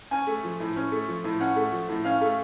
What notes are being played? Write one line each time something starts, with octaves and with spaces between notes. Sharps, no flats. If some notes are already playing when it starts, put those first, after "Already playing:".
C#4 G#5
A3
F3
A2
C#4
A3
F3
A2
C#4 F#5
A3
F3
A2
C#4 F5
A3